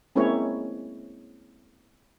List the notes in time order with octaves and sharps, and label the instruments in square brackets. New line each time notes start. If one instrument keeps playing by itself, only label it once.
[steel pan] G#3 A#3 C4 C#4 E4 C#5